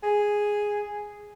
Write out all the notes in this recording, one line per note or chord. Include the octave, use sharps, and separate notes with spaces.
G#4